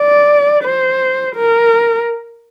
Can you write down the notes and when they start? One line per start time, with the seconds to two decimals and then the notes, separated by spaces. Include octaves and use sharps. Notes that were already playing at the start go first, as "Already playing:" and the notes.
Already playing: D5
0.64 C5
1.36 A#4